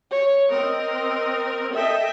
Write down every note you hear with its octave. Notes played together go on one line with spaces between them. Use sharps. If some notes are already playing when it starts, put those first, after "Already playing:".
C#5
C4 A#4 D#5
A4 D#5 E5 G5